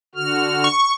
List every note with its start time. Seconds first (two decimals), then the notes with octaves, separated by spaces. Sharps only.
0.15 D3 F#4 F6
0.64 C#6